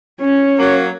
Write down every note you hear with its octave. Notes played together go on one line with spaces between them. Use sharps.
C#4 C#5
F#3 A#3